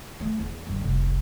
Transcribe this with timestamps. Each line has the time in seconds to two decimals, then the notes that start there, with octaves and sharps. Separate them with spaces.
0.20 A3 C#4
0.40 E2
0.67 G2 D3
0.81 F1 C2